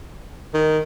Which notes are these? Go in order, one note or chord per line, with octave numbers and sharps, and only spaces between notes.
D#3